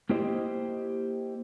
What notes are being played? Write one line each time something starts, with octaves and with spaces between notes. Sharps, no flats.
A#3 E4 G4 C5 D#5